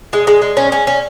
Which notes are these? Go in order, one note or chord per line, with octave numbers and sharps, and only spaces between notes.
G#3
G#3
G#3
C#4
C#4
C#4